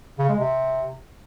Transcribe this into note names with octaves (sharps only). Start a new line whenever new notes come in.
C#3
G#3
C3